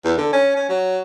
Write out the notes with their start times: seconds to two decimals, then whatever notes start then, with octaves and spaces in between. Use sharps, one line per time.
0.04 E2
0.18 D3
0.33 C#4
0.56 C#4
0.69 F#3